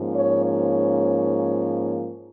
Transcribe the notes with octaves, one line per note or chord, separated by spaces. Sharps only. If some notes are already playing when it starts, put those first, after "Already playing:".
Already playing: G#2 F3 A#3 C#4
C#5
C#5